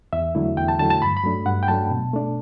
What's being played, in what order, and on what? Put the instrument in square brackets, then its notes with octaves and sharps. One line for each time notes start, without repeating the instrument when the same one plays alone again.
[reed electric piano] E2 E5
D3 F#3 A3 E4
E2 G5
A5
D3 F#3 A3 E4 A5
A5
G2 B5
B5
F#3 A3 D4
G2 F#5
G5
F#3 A3 D4 A5
B2
A3 D4